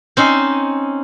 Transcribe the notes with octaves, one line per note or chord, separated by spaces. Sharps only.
C4 C#4 D#4 C5